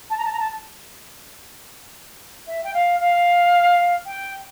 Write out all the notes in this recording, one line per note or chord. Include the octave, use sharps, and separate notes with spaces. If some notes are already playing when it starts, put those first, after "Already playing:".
A5
A#5
A5
A#5
A5
E5
G5
F5
F5
G5